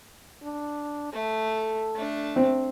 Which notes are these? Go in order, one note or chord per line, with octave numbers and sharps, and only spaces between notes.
D4
A3 A4
A3 D4
C4